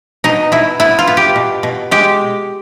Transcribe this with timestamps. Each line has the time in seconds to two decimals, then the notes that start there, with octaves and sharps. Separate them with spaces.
0.24 B2 D#4
0.52 B2 E4
0.80 B3 E4
0.99 F4
1.07 B3
1.17 G4
1.36 B2
1.63 B2
1.91 G#3 G4